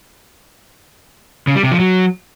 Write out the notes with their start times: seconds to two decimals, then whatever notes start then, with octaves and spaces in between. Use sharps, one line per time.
1.47 C#3
1.55 G3
1.63 C3
1.71 F3
1.79 F#3